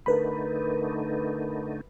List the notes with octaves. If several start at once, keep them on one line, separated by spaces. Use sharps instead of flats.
D3 A3 D#4 A#4 B4 B5